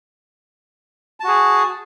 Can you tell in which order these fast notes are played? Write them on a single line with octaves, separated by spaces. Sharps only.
A5 F#4 G#4